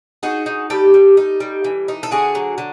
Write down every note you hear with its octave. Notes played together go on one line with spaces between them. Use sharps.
D#4 F#4 G#4
D#4
G3 G4 A4
G3
D#4
G3
E3
D#4
A4
D3 F#4 G#4
F#3
D3